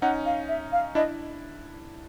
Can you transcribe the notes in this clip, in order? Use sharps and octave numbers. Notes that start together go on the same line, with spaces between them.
C#4 D#4 F#5
F5
E5
F5
D4 E4 D#5